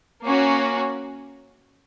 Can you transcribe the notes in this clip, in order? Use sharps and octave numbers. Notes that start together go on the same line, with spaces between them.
A#3 C#4 F#4